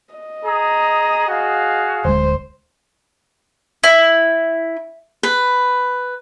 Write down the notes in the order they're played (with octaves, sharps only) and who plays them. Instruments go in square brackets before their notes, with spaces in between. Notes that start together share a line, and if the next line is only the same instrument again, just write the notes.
[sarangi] D#5
[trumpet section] G#4 A#5 D#6
F#4 G#4 F5
[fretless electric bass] D1 D2 G#3 [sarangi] C5
[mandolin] E4
[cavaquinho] B4